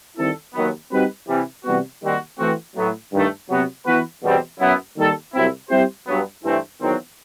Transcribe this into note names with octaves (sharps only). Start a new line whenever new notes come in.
D#3 G3 C4 E4 A4
D#2 D#3 F#3 B3
G3 C4 D#4 F#4 B4
C3 E3 G3
C3 E3 G3 B3 F#4
D#2 D#3 G3 C4 F#4
E3 A3 C4 F#4
A2 F#3 B3
G2 D#3 A3
C3 F#3 B3 F#4
E3 B3 F#4 B4
E2 B2 G3 C4
F#2 F#3 B3 E4
D#2 D#3 G3 D#4 A4
C2 C3 F#3 C4 E4
G3 C4 E4 G4 C5
G2 F#3 B3
G2 E3 A3 C4
E2 D#3 F#3 C4